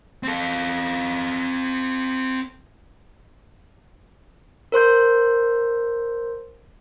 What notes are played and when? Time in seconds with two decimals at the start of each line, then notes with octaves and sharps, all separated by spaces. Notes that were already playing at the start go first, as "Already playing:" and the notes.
0.23 C4 A4
4.72 A#4 C5 C6 G6